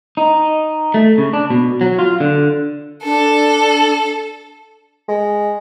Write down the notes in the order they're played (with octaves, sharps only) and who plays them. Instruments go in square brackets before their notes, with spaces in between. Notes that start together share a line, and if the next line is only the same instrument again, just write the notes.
[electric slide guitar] D#4
A3
C#3
D4
B2
F#3
F4
D3
[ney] D4 [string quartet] A4
[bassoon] G#3